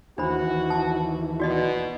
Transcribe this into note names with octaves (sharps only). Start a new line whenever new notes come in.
D#2 E3 D4 F#4 C5 B5
A5
B2 F#4 D5 D#5